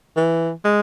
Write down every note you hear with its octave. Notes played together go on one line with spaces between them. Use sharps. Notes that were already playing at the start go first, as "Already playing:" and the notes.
E3
G#3